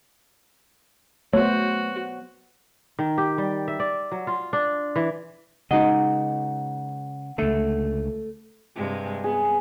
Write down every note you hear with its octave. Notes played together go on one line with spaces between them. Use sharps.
F#3 A3 B3 F#4 C5 C#5
D#3
G4
G3
E5
D5
F#3
F4
D4
E3
C#3 G#3 D#4 F#4 D#5 F#5
C#2 D3 A3
G2 C3 G#3
B3 G#4